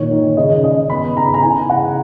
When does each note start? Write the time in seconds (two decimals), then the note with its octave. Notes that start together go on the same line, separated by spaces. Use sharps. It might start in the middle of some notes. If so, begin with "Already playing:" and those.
Already playing: A#2 D#3 C#5
0.11 D#3
0.37 C#3 D#5
0.63 C#3 D#5
0.90 B3 B5
1.17 C#3 A#5
1.25 B5
1.34 A#5
1.42 E4 G#5
1.69 C#3 F#5